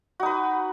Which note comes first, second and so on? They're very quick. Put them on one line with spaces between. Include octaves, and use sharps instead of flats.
F#4 D#4 B4